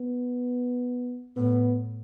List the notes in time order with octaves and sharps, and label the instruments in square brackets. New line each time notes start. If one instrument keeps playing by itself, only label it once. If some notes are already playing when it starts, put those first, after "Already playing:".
Already playing: [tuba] B3
[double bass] A2 [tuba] B3